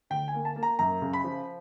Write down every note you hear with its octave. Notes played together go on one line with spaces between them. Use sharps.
D2 G5
G#5
A#3
A5
A#3
A#5
F#2 A#5
C#3
B5
F3